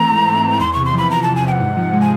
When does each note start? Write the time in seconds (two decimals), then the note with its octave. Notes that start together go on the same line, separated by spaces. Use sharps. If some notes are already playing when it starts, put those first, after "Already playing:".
Already playing: E3 A3 C4 A#5
0.11 G#2
0.28 C4
0.44 E3
0.60 E2 C6
0.73 C3 C#6
0.85 C6
0.93 F3 B5
1.10 E2 A#5
1.23 E2 A5
1.36 G#5
1.43 C3 G5
1.52 F#5
1.60 G#2
1.77 F3
1.93 G#3
2.01 G#5